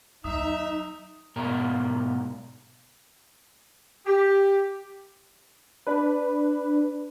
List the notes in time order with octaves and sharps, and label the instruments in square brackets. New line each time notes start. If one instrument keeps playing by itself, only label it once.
[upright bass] D#2 F#3 [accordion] D#4 [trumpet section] E5 [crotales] D#6
[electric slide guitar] G#2 B2 A#4
[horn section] G4
[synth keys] D4 B4